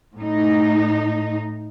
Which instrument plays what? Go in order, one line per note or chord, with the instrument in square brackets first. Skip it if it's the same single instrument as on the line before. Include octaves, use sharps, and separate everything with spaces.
[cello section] A2 D#4